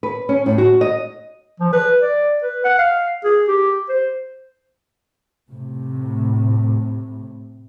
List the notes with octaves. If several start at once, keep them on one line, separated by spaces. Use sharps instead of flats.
B4
C#4
A2
F#4
D#5
F3
B4
D5
B4
F#5
F5
G#4
G4
C5
A2 C3